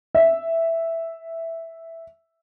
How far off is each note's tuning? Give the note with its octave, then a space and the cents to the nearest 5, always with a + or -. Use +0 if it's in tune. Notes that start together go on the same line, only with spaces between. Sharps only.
E5 +0